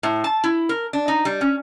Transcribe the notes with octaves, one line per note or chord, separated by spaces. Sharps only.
A2
A5
E4
A#4
D4
D#4
G3
C#4